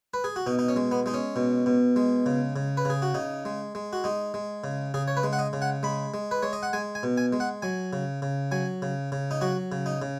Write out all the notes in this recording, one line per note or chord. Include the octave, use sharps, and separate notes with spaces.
B4
G#4
F#4
B2 D#4
D#4
C#4
G#3
B3
G#3 D#4
C#4
B2
B2
G#3
C#3
C#3
B4
C#3 G#4
F#4
C#3 D#4
G#3
G#3
F#4
G#3 D#4
G#3
C#3
C#3 G#4
C#5
B4
G#3
F#5
D#5
C#3
F#5
G#3 B5
G#3
B4
G#3 C#5
D#5
F#5
G#3 G#5
G#5
B2
G#5
G#3
F#5
F#3 G#5
C#3
C#3
F#3 G#5
C#3
C#3
D#4
F#3 F#4
C#3
D#4
C#3